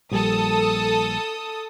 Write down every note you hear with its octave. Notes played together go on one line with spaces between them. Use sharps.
A#1 G3 A4 D#6